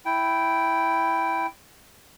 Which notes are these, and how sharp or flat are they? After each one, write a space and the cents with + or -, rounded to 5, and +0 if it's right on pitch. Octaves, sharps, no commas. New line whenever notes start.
E4 +0 G5 -5